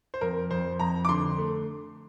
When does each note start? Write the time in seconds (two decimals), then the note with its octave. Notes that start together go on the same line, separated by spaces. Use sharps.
0.14 C5
0.21 F2 A#4
0.50 F2 C5
0.79 F2 A#5
1.05 D6
1.09 D3 C6
1.38 A3